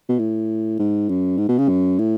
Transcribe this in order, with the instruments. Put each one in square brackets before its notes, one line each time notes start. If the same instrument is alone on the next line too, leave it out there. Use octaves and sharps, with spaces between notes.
[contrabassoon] B2
A2
G#2
F#2
G#2
B2
C#3
F#2
A2